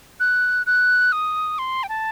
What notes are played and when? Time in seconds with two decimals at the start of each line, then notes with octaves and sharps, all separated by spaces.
0.20 F#6
0.66 F#6
1.12 D#6
1.59 C6
1.83 G5
1.89 A5